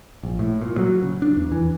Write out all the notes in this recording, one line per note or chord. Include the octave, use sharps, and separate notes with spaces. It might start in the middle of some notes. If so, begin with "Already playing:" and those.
A#1
A2
A#2
F#3
C#3
D4
E2
E3